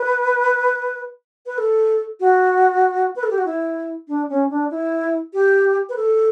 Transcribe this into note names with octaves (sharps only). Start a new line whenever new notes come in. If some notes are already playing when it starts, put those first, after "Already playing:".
Already playing: B4
B4
A4
F#4
B4
A4
G4
F#4
E4
D4
C#4
D4
E4
G4
B4
A4